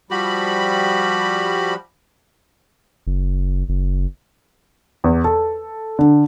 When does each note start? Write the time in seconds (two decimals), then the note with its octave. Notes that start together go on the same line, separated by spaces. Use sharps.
0.11 F3 G3 F#4 G4 B5
3.07 F#1
3.69 F#1
5.04 E2
5.24 A4
5.99 D3